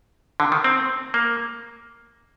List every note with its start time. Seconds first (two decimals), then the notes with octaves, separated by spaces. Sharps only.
0.40 D3
0.52 D#3
0.64 C4
1.14 A#3